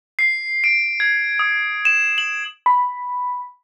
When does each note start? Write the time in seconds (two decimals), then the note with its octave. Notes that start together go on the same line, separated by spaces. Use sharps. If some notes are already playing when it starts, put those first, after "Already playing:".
0.19 C7
0.64 D7
1.00 G#6
1.39 D#6
1.85 E7
2.18 F#7
2.66 B5